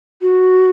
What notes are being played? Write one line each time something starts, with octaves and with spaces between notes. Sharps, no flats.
F#4